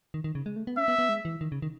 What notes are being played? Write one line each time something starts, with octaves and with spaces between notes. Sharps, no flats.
D#3
D#3
C#3
G#3
A3
B3
C#4 E5
B3
B3
G#3
E3
D#3
C#3
D#3